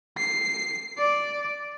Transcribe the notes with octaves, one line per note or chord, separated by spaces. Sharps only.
C7
D5